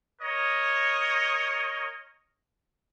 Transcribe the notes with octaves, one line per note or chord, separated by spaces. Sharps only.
A#4 C#5 D#5